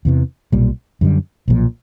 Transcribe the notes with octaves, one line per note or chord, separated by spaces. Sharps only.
E2 C3 E3
B1 A#2 G3
F#2 D3 G3
B1 A#2 F3